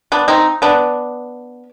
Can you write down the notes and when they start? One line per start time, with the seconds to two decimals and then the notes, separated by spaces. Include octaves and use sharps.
0.12 B3 D4
0.28 C4 D#4
0.62 B3 D4